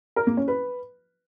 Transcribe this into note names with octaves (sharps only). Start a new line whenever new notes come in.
A#4
A#3
C#4
B4